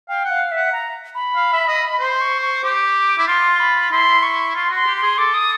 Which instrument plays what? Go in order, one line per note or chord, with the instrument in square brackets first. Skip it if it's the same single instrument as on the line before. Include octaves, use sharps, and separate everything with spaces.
[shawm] F5 [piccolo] G5
[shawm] F#5
[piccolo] F5
[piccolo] E5 [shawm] F#5
[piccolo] A#5
B5
[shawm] F5
E5
D#5
[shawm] C5 [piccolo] C6
[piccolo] C#6
C#6
[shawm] G4 [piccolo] D6
[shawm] E4
[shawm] F4 [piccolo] C6
[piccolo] B5
[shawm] E4 [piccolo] C6
[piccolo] C#6
[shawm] F4 [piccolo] C6
[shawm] F#4 [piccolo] C6
[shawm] G4
[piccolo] C6
[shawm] G#4
[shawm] A4 [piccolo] D6
[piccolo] D#6